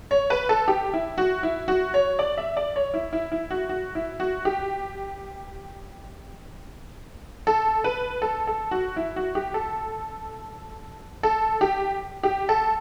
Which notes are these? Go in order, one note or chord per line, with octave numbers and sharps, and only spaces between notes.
C#5
B4
A4
G4
E4
F#4
E4
F#4
C#5
D5
E5
D5
C#5
E4
E4
E4
F#4
F#4
E4
F#4
G4
A4
B4
A4
A4
F#4
E4
F#4
G4
A4
A4
G4
G4
A4